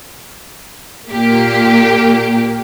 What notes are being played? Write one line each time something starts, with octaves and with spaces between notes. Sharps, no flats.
A#2 A#3 G4